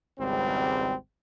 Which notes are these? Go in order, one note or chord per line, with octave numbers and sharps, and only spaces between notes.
G#1 C#2 G3 C4